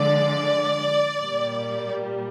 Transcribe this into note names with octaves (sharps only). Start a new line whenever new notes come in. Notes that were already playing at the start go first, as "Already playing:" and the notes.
Already playing: D3 F3 G#3 D5
A#2 G3 A#3